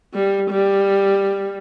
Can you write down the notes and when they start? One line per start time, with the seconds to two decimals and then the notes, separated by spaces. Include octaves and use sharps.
0.14 G3
0.51 G3